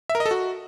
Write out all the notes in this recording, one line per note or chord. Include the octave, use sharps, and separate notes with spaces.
E5
A#4
D#5
A4
F#4